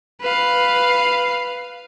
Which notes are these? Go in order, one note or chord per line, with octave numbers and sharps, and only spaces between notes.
B4 F5